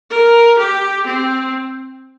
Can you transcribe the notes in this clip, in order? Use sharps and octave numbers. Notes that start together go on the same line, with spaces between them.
A#4
G4
C4